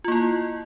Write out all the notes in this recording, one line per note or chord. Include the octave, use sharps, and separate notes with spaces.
A#3 E4 F4